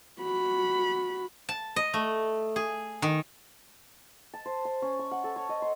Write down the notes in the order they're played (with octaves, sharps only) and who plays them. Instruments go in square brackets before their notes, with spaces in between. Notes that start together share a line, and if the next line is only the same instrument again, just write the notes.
[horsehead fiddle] F#4 B5
[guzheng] A5
D#5
A3
G#4
D#3
[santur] A5
C5
C6
C#4
C#6
F#5
A4
C#5
D#5
C6